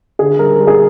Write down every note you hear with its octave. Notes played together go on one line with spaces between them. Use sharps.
D3 G#4
G3 A#4
G3
G#4